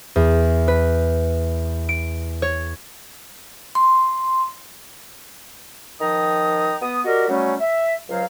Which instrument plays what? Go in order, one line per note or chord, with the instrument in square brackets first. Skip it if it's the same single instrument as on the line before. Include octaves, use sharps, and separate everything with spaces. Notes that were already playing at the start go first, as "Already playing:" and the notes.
[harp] E2
B4
D7
C#5
[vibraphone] C6
[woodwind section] D#3 F3 G5 A#5 D#6
B3 D#6
F#4 G4 A#4 D5 D#5
F#3 G3 A3 C#4
E5
C#2 F#3 C5 F5